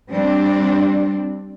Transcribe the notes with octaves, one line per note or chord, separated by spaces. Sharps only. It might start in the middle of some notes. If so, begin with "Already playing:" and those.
G3 C4 D4